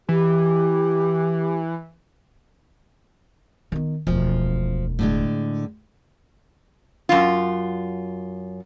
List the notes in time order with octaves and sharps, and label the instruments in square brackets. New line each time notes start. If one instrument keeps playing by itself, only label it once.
[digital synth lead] E3 [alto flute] G4
[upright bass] D#3 B3
[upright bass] E1 D2 [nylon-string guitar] F3
[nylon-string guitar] A2 D3 G#3
[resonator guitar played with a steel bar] F#2 F4